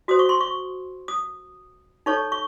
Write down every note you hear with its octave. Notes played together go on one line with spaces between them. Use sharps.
F#4 C5 D#6
C#6
C6
C#6
D#6
D#4 A4 C#5 C#6
C#6